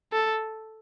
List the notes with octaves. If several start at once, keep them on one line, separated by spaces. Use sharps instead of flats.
A4